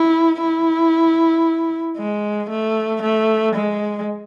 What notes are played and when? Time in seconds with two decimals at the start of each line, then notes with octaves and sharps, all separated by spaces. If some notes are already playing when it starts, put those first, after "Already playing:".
Already playing: E4
0.41 E4
1.98 G#3
2.50 A3
3.02 A3
3.55 G#3